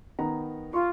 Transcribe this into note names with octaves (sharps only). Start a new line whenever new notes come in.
D#3 B3 A#5
F4 C6 C#6